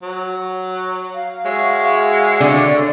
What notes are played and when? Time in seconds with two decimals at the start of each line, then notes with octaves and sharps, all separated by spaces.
0.03 F#3
1.14 F5
1.45 G#3 F#4 C#5 E5
2.40 D3 D5